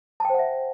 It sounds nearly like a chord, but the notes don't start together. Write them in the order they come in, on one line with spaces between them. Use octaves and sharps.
A5 G5 C5 F#5 E5